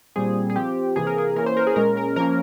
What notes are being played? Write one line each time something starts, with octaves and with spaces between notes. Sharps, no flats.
A#2 G3 C4 G#4
G#4
F3 C4 G4
C3 E3 A#3 G#4
A#4
G#4
E3 A#3 C#4 A#4
C5
A#4
G#4
A#2 G#3 C#4 A#4
A#4
F3 A#3 C#4 A#4